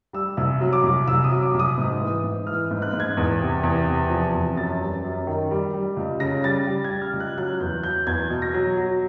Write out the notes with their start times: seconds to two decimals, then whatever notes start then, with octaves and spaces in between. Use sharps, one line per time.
0.13 G3 E6
0.37 C2 E6
0.61 F#3
0.73 D6
0.83 C2
1.07 C2 E6
1.24 D#6
1.30 F#3
1.42 D6
1.54 C2
1.59 D#6
1.78 G#2
2.01 E3
2.24 G#2
2.47 E3 F6
2.71 G#2
2.82 F#6
2.93 G#2
3.00 G#6
3.17 E2
3.40 C3
3.63 E2
3.88 C3
4.10 F3
4.33 E2
4.57 F#2 A6
4.80 G3
5.04 F#2
5.27 D#3
5.51 G3
5.74 G3
5.97 C#2
6.20 C#3 A#6
6.44 G3 A6
6.67 G3
6.84 G#6
6.90 G3
7.01 F6
7.13 C#2
7.20 F#6
7.37 F#3 F#6
7.60 E2 G6
7.83 F#3 G6
8.07 E2 G#6
8.30 B2
8.42 A#6
8.54 F#3
8.77 F#3